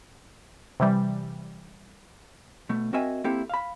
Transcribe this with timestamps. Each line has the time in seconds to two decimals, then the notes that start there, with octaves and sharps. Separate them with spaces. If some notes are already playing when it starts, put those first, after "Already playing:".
0.80 C3 E3 G3
2.69 B2 A3
2.93 C4 F#4 A#4 D#5 E5 G#5
3.24 A#3 C4 E4 G4 A4
3.50 F5 B5